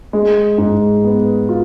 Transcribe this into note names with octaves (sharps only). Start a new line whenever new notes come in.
G#3
G#2
B3
F4